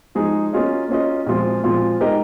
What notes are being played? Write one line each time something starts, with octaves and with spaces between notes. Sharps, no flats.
F3 G#3 D#4 G#4
A#3 C#4 F4 G#4 D#5
A#3 C#4 F4 G#4 D#5
A#2 F3 G#3 C4 F4
A#2 F3 G#3 C4 F4
G#3 D#4 G4 A#4 D#5